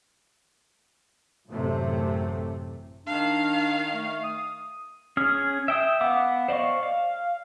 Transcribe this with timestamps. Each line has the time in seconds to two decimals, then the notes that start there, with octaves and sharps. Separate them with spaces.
1.50 A1 F#2 C3 A3
3.06 D#3 D4 F5
3.94 A3
4.24 D#6
5.17 C#4 G#4 F6
5.68 E5 G5 D#6
6.01 B3 F5 F#5 D6
6.48 C5 D5 D#5 F5 C#6
6.83 F5